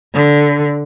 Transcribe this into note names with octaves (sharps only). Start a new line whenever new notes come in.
D3